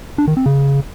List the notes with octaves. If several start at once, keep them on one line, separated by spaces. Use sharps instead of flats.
D4
D#3
C4
C#3